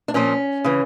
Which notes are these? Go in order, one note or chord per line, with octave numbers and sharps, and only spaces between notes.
D4
A#2 F3 A#3 C#4
C#3 E3